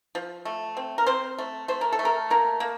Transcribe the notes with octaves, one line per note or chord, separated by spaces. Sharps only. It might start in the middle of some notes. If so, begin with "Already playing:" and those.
F3
A3
C4
A#4
C4 C5
A3
A3 C5
A#4
A4
A3
A#4
A#3 A#4
A#3